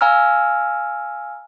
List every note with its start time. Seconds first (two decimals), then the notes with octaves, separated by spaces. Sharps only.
0.01 F5 G#5 A#5 E6 F6